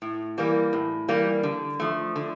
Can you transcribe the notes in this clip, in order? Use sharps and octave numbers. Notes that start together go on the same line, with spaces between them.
A2
E3 G3 A#3
A2
E3 G3 A#3
D3
F3 A3
D3